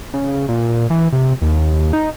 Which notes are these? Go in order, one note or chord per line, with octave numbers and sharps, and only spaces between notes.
C#3
A#2
E3
C3
D#2
D#4